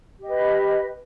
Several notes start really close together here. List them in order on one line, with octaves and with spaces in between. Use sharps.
G4 D#5 B4